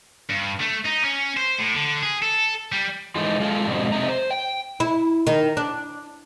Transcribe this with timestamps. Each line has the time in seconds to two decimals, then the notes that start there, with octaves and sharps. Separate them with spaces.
0.29 G2
0.60 A3
0.85 D#4
1.04 C#4
1.37 C5
1.59 A2
1.74 D3
2.02 G#4
2.23 A4
2.72 G3
3.16 E3 F3 G#3 A3 D#4
3.40 G#3 F4 A4
3.66 F2 G#2 B2 D3
3.92 C3 A3 D#4 A#5
4.09 C5
4.31 G5
4.80 E4
5.27 D#3
5.57 D4